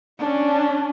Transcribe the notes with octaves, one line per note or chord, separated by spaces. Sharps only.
C#4 D4